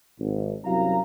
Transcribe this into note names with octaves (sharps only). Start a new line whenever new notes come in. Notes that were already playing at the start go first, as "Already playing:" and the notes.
G#1
C2 F#2 F#3 F5 A#5